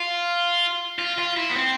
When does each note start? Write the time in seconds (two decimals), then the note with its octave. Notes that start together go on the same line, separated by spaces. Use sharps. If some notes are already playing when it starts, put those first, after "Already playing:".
Already playing: F4
0.99 F4
1.18 F4
1.36 E4
1.49 B3
1.56 C4